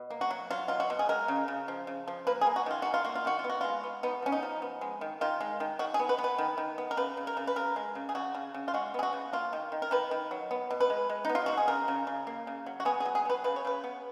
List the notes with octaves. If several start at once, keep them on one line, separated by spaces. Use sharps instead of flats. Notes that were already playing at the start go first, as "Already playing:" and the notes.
Already playing: B2
A#3
F#4
F#3
F#3 F4
B2 F4
F#4
B2
G#4
G#3 A#4
C#3
C#3
F3
C#3
F3
A#3 B4
G#4
A#3
F#4
D#3 F4
A#3 F#4
F4
A#3 F#4
F4
D#3 F#4
F4
B3
F#4
G#3 F4
B3
B3 D#4
F3 C#4
D#4
F3
B3
G#3
D#3
D#3 F4
G#3
D#3
D#3 F#4
G#4
B3
B4
B3
B4
D#3
D#3
B3
A#4
C#3 B4
C#3
A#4
C#3
B4
C#3 A#4
G#3
C#3
G#4
C#3 F#4
C#3
C#3
F4
G#3 F#4
B3 G#4
F#4
C#3
A#3 F4
D#3
D#3
A#4
D#3 B4
D#3
F#3
B3
B2
B4
G#3
G#3
B3 D#4
F4
B2 F#4
G#4
C#3 A#4
C#3
C#3
A#3
C#3
F#3
F#4
B3 G#4
G#4
F#3
G#4
B3 B4
C#3 B4
C#5
C#3 B4
B3